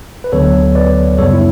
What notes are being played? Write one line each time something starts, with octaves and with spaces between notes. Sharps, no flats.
B4
D2 D3 F#3 B3 A4 C#5
B4 D5
F#2 C#3 G3 B3 A4 C#5
E4